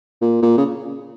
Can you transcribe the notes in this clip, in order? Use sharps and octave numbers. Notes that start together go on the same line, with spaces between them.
A#2
A#2
C#3